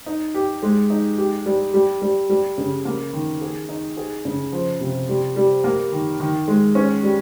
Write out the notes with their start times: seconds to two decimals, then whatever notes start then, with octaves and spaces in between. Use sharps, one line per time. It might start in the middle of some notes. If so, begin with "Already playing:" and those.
0.06 D#4
0.34 G4
0.63 G#3
0.90 D#4
1.18 G4
1.46 G3
1.74 G3
2.02 G3
2.29 G3
2.58 C#3
2.85 A#3
3.13 D#3
3.41 G#4
3.69 D#4
3.97 G#4
4.25 C#3
4.52 F3
4.80 C3
5.09 G3
5.36 G3
5.64 A#3
5.92 D#3
6.20 D#3
6.48 G#3
6.75 C#4
7.03 G3